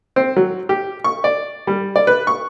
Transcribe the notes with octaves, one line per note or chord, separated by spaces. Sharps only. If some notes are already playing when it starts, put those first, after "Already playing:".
C4
F#3
G4
C#6
D5
G3
D5
B4
C#6